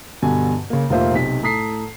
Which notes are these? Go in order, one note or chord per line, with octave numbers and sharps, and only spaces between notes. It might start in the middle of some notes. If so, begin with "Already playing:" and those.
G2 B2 D3 G#5
C#3 A#3
F1 A#2 A#3 F4 C5 E5
B1 C3 B6
A2 A4 A#5 D#6 B6 C7